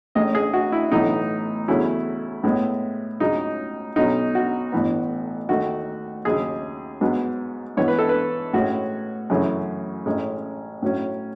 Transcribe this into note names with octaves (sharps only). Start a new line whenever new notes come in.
A1 A2 G#3 C#4 D#5
G#4
F#4
E4
B1 A2 E3 B3 D#4
E2 C#3 F#3 A3 C#4 E4
A2 G#3 B3
C#2 C#3 F#3 D#4
B1 B2 F#3 C#4 D#4
F#4
A1 A2 E3 B3
D#2 D#3 A3 F#4
D#2 C#3 F#3 G#4
G#2 F#3 B3
G#2 E3 B3 C#5
B4
A4
B4
A2 G#3 C#4 F#4
F#2 C#3 E3 A3 C#4
A1 A2 G#3 C#4
A2 F#3 C#4